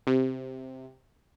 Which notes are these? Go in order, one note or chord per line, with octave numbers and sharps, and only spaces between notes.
C3